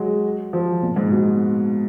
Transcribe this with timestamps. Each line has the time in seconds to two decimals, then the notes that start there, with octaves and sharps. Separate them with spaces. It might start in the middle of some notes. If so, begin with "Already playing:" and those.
Already playing: F#3 G#3
0.53 F3
0.83 A#2
0.96 G#2
1.11 B2